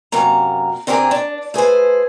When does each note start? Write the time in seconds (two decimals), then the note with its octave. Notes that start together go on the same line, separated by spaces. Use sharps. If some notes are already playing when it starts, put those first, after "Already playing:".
0.12 F#2 C3 A#3 A#5
0.87 C3 C4 D4 G#4 A#4
1.11 D4
1.54 A3 G#4 B4 C5